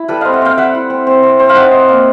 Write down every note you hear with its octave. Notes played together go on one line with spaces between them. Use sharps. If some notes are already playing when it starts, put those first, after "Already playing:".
Already playing: E4
G3 A4 B4
C4 D#5 F5
E5 F#5
C4 F5 G5
G3 E5 F#5
E4
C4
C4
C4
C4
F5
D#4 E5 F#5
D#4
A#3